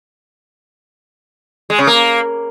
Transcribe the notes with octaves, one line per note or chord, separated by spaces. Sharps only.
G#3
C#3
A#3